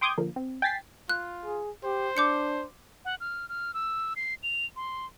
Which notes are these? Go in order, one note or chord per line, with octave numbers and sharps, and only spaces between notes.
G5 C6 D6 D#6 G6 G#6
D3 F3 A#3
C4
G5 G#5 A6 B6 C7
F4 F#6
G#4
G4 C5
D4 D6 G6 C#7
F#5
F6
F6
E6
C7
F7
C6